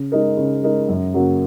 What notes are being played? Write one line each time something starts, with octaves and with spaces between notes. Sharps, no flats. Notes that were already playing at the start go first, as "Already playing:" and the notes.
Already playing: C#3
G#3 D#4 A#4
C#3
G#3 D#4 A#4
F#2
C#3 F#3 A#3 F#4